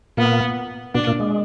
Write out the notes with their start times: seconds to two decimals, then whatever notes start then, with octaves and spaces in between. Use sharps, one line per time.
0.17 A#2 A#3 B3
0.94 B2 B3 D4
1.07 A#2 A#3
1.20 G#3